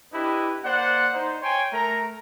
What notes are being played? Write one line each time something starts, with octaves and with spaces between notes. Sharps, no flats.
D4 E4 G4 B4 D#5
A#3 C5 D5 F#5
D#4 C5
C#5 G5 G#5 C6
A3 A#4 A#5